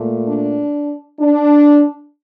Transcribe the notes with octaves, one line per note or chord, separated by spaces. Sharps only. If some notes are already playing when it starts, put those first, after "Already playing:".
Already playing: A#2 A3
D4
D4